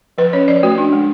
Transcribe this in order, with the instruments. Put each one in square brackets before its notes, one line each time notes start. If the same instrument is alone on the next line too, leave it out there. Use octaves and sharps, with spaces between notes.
[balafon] F3 B4
C#4 C#5
F3 D5
A3 F#4
D4
G#3